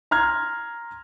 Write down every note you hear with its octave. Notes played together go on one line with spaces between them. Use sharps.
A#5 C6 F6 G#6